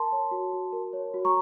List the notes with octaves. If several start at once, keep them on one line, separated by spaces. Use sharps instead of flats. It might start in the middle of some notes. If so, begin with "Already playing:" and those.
Already playing: A#4 A5 C6
C#5
F#4
F#4
A#4
C#5
F#4
A#5 C#6